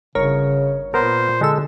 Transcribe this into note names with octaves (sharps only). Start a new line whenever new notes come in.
G1 C#3 A#4 C#5
A#2 B3 A#4 C5
D3 G#3 A4 E6